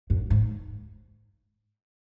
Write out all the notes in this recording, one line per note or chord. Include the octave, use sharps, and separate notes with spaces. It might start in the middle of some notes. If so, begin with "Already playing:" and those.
F#2
G#2